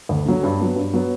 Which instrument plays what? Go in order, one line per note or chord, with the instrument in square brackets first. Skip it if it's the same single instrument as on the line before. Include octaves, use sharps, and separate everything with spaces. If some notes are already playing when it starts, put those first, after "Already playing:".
[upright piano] D2
D3 F#3
G2
F#3 B3
G2
F#3 B3